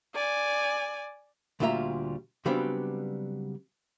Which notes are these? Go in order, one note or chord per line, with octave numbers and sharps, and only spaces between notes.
D5 G#5
D2 A#2 G3 F4 E5 A#5
C#3 F#3 G3 B3 C4 D4